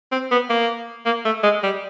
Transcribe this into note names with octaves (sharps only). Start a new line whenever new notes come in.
C4
B3
A#3
A#3
A3
G#3
G3